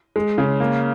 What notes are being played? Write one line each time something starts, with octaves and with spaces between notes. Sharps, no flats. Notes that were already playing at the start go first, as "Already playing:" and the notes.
G#3
C#3
A#3